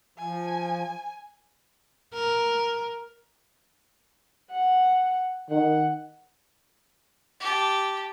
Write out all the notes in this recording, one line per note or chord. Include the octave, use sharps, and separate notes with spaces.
F3 G#5
A#4
F#5
D#3 F#5
G4 A5